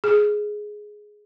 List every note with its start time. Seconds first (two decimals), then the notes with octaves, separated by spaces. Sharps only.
0.04 G#4